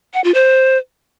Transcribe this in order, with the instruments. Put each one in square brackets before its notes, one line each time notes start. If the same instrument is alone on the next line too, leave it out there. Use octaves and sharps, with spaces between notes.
[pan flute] F#5
F4
C5